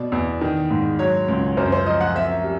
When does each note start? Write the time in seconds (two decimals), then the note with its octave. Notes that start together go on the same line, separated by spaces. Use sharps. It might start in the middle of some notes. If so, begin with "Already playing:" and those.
Already playing: B2 D5
0.12 E2
0.41 D#3
0.70 G#2
0.99 F#3 C#5
1.28 C#2
1.57 F#2 C5
1.72 C5
1.86 F3 D#5
2.01 F#5
2.15 C4 E5
2.44 G3